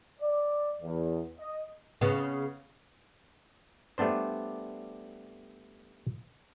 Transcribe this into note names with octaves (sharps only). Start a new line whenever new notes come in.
D5
E2
D#5
C#3 B3
G3 A3 B3 D4 C5